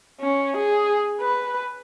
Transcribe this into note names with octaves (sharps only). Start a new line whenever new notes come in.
C#4
G#4
B4